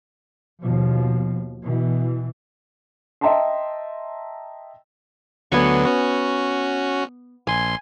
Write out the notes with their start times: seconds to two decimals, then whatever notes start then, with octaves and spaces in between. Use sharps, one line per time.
0.60 D#2 B2 F3
1.64 B2 E3
3.21 D#5 E5 G5 A5 A#5 C6
5.52 D2 D3 F#3 B3 G#5 C#6
5.85 C#4 F#4
7.47 A#1 G#5 C6